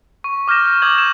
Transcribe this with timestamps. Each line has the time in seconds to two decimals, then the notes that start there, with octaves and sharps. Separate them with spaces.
0.24 C#6
0.48 D6 F6 G6 A#6 E7
0.66 F6 E7
0.82 D6 D#6 G6 G#6 F#7
0.98 E7